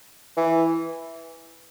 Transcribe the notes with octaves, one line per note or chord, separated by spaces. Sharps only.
E3